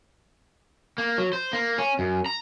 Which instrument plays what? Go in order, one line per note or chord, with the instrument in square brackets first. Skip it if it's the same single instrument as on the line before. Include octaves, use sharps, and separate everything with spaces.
[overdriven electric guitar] A#3
F#3
C5
A#3
C#4
F#2
A#5